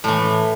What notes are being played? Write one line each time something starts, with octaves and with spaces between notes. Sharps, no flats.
A2 E3 A3